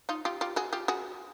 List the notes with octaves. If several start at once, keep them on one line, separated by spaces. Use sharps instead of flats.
D#4 F4
F4 G4
F4 G4
F#4 G#4
F4 G4
F#4 G#4